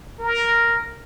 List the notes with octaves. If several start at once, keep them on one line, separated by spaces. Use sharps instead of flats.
A#4